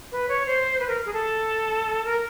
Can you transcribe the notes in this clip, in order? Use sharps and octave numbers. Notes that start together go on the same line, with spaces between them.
B4
C#5
C5
B4
A#4
G#4
A4
A#4